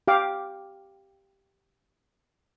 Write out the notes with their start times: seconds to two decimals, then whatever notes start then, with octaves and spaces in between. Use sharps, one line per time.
0.08 G4 F5 D6